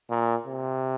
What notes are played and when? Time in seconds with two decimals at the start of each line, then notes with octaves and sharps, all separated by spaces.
0.10 A#2
0.46 C3